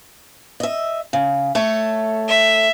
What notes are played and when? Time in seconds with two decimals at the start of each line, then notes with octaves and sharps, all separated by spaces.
0.60 D#5 E5
1.13 C#3
1.55 A3 A4 C#5
2.28 E5